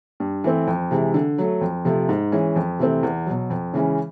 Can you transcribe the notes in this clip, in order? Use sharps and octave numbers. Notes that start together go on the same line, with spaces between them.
G2
E3 A3 C4
F2
C3 E3 G#3
D3
F#3 A3
F2
C3 F3 A3
G#2
E3 G#3 C#4
F2
C3 E3 A3 C4
E2
B2 F#3
F2
C#3 E3 G#3 C#4